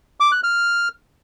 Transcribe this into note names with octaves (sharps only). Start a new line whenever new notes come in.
D6
F#6
F6